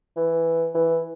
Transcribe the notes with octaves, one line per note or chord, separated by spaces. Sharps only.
E3
E3